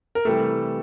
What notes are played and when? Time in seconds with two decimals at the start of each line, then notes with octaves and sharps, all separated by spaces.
0.15 A#4
0.25 C3 E3 G3 A3 A4